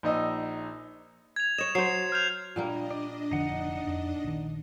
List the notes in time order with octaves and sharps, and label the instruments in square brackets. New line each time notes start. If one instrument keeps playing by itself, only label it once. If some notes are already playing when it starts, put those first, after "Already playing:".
[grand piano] A#1 D#4 D#5 E6
[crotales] G#6 F7
[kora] C#5 D#5 [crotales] E7
[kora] F#3 C5 [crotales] C7
[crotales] F6 G6 F7
[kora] A#2 G3 A#3 [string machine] D4 D#5
[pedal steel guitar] D5
[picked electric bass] F1 D3 F3 [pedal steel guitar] D#4 F#5
[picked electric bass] F2
A#1 D#3